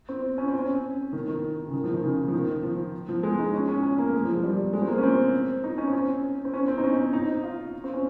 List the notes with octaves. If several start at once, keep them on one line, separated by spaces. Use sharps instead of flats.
C4
C#4
C4
C#4
D#3
D#3
C#3
D#3
F3
D#3
C#3
F3
D#3
F3
F3
G#3
D#4
C#4
C#4
C#4
A#3
G#3
F3
F3
G3
G#3
C4
A#3
C#4
C4
D#4
C#4
C4
C#4
C4
C#4
C4
D#4
C#4
D#4
F4
C4
C#4